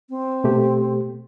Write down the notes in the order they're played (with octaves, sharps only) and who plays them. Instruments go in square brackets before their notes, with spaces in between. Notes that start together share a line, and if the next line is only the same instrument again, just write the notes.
[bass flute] C4
[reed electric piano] B2 A3 G4